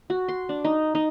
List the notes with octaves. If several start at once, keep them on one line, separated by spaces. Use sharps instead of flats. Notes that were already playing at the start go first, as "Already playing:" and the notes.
F#4
C6
D4
D#4
D#4